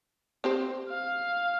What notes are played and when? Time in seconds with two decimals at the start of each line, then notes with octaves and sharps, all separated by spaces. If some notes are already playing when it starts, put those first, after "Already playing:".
0.44 C4 G4 C5
0.90 F5